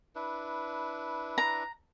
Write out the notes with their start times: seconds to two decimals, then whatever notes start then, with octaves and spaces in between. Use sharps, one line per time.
0.15 D4 E4 B4
1.38 A#5